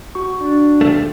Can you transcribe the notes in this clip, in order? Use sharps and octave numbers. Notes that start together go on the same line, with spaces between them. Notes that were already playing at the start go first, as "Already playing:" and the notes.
F#4 C#6
D4
D#2 F3 A3